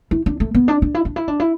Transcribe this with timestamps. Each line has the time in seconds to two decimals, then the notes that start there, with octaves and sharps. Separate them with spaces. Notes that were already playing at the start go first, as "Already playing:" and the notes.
0.11 E4
0.26 D4
0.40 A3
0.54 B3
0.68 D4
0.82 D4
0.94 E4
1.05 D4
1.16 E4
1.28 D4
1.40 E4